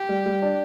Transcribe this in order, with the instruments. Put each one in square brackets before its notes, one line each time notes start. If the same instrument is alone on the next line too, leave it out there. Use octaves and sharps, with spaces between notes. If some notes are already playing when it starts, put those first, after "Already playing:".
Already playing: [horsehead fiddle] G4
[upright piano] G3
G3
D4